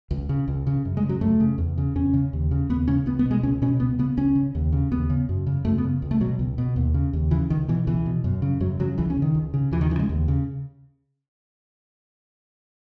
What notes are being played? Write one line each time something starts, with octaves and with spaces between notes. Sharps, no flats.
C#2
C#3
C#2
C#3
F#2
G#3
C#3
F#3
F#2 A3
C#3
E2
C#3
E2 C#4
C#3
D#2
C#3
D#2 B3
C#3 C#4
C#2 B3
B3
B2
G#3
C#2 C#4
B2 C#4
C#2 B3
C#3 B3
C#2 C#4
C#3
D#2
C#3
D#2 B3
C#3
F#2
C#3
F#2 A3
B3
C#3
C#2
A3
B2 F#3
C#2
B2
D#2
C#3
D#2
C#3 E3
C#2 D#3
B2 E3
C#2 E3
B2
F#2
C#3
F#2 F#3
C#3 F#3
C#2 E3
C#4
C#3
D#3
C#2
C#3
D#2 E3
D#3
C#3 E3
G#3
D#2
C#3